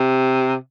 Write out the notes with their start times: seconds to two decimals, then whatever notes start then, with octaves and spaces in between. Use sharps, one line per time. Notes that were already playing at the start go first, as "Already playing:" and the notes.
Already playing: C3